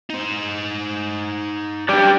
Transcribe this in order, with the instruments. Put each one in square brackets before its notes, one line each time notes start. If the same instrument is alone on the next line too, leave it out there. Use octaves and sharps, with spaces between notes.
[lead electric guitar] D#4 C5
[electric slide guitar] D4 G4 D5